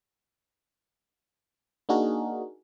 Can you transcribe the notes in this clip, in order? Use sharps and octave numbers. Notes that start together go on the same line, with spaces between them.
A#3 D4 D#4 F#4 G#4 A#4